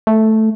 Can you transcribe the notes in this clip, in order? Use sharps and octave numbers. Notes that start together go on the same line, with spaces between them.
A3